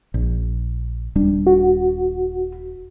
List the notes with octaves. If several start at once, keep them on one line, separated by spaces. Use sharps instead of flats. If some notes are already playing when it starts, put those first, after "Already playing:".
A#1
D#1 G3 D4
F#4